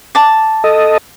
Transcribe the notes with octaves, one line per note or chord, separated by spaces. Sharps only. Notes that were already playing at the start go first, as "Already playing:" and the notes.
A5 D6
A4 D#5